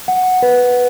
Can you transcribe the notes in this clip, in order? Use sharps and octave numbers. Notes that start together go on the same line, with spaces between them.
F#5
B4